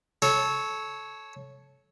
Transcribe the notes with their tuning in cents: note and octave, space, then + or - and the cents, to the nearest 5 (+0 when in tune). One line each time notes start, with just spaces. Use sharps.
A4 -20 C#5 +0